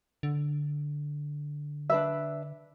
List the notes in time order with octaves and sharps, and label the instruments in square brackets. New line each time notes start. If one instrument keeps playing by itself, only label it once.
[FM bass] D3
[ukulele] D4 B4 E5